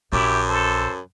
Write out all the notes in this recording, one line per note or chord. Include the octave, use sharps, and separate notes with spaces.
A#1 F#2 E4 G4
A4 C5